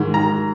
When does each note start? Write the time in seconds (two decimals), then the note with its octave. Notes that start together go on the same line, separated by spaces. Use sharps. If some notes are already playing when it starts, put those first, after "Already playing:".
Already playing: G#2 D#3
0.14 A#5